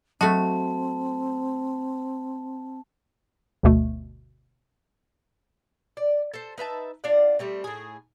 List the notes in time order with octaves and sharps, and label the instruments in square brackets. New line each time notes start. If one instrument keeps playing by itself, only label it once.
[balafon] F#3 [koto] A3 F#4 [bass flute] C4 [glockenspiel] A5
[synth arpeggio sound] G1 D2 B2 A3
[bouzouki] D5
A4 C5
D#4 B4 E5 A5
D4 F4 D5 F#5
G3 A3 C4
A2 D#4 G#4